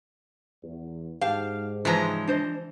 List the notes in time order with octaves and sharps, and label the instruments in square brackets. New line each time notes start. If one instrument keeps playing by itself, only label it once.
[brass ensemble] E2
[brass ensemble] G#2 [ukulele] G4 A5 [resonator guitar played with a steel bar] F5
[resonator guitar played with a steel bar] C#3 F3 G#3 [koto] E3 A#5
[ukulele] D4 C5 D#5